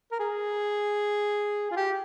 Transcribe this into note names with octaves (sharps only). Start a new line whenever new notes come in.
A#4
G#4
F4
G4